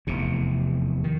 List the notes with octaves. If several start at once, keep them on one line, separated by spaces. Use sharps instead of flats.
F1 E2 C3
D#3